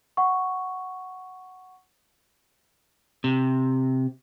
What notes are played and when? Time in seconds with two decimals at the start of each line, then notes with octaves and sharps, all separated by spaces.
0.17 F#5 C#6
3.24 C3